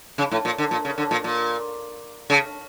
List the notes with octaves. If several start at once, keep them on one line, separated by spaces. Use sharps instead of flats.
C#3
A2
A#2
D3
A#2
C#3
D3
A#2
A#2
C#3